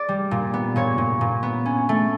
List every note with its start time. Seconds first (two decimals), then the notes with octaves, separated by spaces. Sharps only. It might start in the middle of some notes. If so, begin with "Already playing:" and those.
Already playing: D5
0.09 G3
0.31 A#2
0.54 B3
0.76 A#2 C#5
0.98 A#2
1.21 A#2
1.43 B3
1.66 C#4
1.89 A3